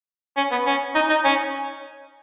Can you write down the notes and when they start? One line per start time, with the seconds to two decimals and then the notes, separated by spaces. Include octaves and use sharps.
0.37 C#4
0.51 B3
0.66 C#4
0.95 D#4
1.09 D#4
1.24 C#4